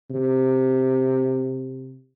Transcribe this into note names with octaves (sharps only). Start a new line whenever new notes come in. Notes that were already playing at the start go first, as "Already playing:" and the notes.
C3